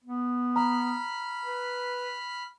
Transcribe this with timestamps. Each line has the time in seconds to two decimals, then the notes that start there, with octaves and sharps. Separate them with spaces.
0.05 B3
0.56 A#5 B5 F6
1.45 B4